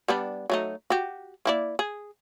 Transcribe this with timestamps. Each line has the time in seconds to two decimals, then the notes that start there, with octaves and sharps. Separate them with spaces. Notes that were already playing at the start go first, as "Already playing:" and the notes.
0.08 G3 B3 D4
0.50 F#3 A3 D#4
0.90 F#4 G4
1.45 A#3 E4 D5
1.79 G#4